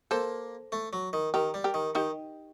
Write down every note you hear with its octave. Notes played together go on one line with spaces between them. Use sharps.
A#3 A4 C5
A3
F#3
D#3
D#3 G4 A#4
G3
G4 A#4
D#3
D#3 D#4 G4